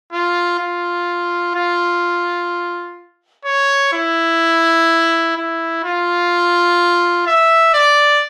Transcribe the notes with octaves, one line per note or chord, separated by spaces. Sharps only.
F4
F4
F4
C#5
E4
E4
F4
E5
D5